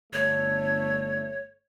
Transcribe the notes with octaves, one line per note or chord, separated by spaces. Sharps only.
G1 A3 C#5